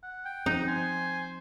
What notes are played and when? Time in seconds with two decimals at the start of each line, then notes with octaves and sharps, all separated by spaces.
0.03 F#5
0.25 G5
0.46 F3 C4 D#4
0.67 C5 G#5